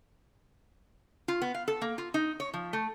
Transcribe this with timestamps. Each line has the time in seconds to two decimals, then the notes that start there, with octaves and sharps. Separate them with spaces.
1.28 F4
1.42 B3
1.54 F5
1.68 A4
1.82 A#3
1.98 F4
2.14 D#4
2.40 C#5
2.54 F3
2.73 A3